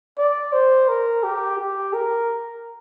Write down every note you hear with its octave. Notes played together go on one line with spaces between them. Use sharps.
D5
C5
A#4
G4
G4
A#4